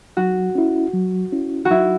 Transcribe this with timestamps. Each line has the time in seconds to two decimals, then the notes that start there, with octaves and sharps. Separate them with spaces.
0.17 F#3 F#4
0.55 C#4 E4
0.93 F#3
1.32 C#4 E4
1.65 F#4
1.70 F#3 E4